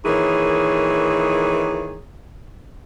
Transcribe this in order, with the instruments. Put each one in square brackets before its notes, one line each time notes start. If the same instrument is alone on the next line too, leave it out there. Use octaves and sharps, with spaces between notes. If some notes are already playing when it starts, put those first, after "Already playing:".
[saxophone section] A#2 D#3 E3 G#4 C#5